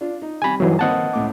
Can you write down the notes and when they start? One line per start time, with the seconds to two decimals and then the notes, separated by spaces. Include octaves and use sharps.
0.01 D4 F4
0.22 D#4
0.42 C3 G3 G#5 B5
0.60 G2 D3 E3 F#3 D#4
0.79 D#3 A#3 C4 D#5 F#5 A5
1.13 C#2 A2 D6